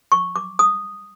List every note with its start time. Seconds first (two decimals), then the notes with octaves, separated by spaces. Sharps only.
0.12 C#6
0.36 D6
0.59 D#6